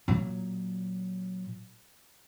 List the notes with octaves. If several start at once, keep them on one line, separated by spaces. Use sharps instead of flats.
A#2 F#3